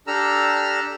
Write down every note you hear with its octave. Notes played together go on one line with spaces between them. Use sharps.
D4 G4 A4 A#5 E6 F6